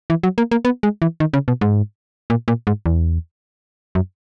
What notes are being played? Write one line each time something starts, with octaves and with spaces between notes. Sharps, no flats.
E3
F#3
A#3
A#3
B3
G#3
E3
D#3
C#3
B2
G#2
A#2
A#2
G#2
E2
F#2